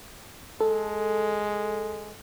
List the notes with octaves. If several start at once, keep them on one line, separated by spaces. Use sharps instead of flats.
G#3 A4